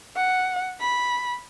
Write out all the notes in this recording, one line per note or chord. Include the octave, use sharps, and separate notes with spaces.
F#5
B5